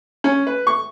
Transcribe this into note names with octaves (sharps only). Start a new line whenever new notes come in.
C#4
B4
C#6